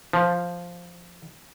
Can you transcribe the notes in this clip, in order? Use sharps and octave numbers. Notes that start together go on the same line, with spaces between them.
F3